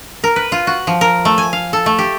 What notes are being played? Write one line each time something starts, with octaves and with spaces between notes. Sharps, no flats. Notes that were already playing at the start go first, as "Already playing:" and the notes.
A#4
B4
F4
F#4
F3
A#4
A3
G#5
F5
A4
A3
G4